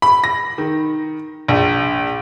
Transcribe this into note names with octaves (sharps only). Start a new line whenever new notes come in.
B5
A#6
D#3
A#1